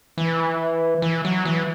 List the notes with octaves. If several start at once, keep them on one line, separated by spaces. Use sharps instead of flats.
E3
E3
F#3
E3